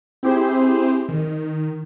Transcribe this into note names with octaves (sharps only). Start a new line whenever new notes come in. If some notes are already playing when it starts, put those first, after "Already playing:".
C4 E4 G4 G#4 C5
D#3